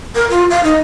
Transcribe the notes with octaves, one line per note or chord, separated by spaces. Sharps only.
A#4
F4
F5
D#4